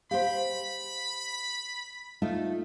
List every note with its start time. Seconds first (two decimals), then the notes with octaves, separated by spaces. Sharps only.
0.11 G4 C5 F5 F#5 B5 C6
2.22 A3 D#4 F4